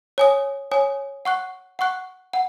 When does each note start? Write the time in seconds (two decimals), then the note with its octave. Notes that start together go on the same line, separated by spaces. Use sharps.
0.18 C#5 G#5 D#6
0.71 C#5 G#5 D#6
1.25 F#5 C#6 F#6
1.79 F#5 C#6 F#6
2.33 F#5